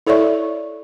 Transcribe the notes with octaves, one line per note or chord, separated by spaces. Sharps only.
E4 A4 C#5 D5 E5 C#6